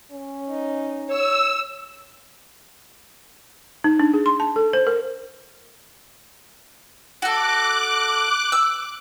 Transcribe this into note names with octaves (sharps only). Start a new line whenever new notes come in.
C#4
D#4
C#5 E6
D#4
D4
G#4
C6
A5
A4
C5
A#4
F#4 A4 D6 F#6
E6